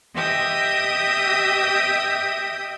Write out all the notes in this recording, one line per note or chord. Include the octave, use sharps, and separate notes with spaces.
G4 D#5 E5 D#6 G6